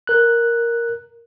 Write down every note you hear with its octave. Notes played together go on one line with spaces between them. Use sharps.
A#4 F#6